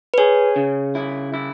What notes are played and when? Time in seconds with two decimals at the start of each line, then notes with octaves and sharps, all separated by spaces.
0.14 B4
0.18 G#4 C#5
0.56 C#3
0.95 E4
1.34 E4